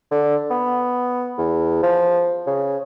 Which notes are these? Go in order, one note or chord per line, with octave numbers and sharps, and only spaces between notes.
D3
B3
E2
F3
C#3